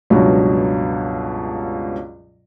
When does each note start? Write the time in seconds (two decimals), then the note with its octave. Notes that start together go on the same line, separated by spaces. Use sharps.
0.10 C#2 G2 B2 F#3